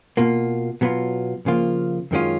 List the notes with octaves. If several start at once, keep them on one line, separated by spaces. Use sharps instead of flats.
B2 A#3 F4
B2 F#3 B3 F4
C#3 F3 A#3 F4
F#2 D#3 G#3 C#4 F4